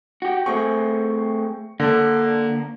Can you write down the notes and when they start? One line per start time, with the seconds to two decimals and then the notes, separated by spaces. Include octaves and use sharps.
0.22 F#4 G4
0.46 A3 C4 G#4 C#6
1.80 D3 A#3 D4